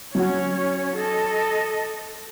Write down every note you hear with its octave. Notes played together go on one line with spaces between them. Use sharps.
F#3 C#4 F#4 C#5
A4 D#5